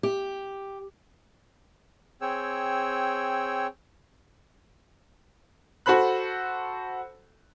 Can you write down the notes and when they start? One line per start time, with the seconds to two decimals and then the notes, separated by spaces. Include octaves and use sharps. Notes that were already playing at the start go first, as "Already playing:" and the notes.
0.03 G4
2.21 C4 G#4 C#5 G5 E6
5.86 F#4 A4 C5 B5 F#6